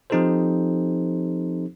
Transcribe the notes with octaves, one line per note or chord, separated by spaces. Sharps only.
F3 C4 D#4 G4 A4 C5